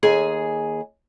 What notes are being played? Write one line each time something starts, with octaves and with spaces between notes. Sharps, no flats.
D#2 G#4 G#5